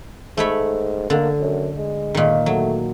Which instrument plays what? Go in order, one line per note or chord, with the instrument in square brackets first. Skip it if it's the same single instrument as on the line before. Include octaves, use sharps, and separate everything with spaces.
[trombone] G#2 [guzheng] A3 C#5 B5
[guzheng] D3 [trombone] A#3
[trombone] F#2
G#3
[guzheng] A#2 D#3
[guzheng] F#3 [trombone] A3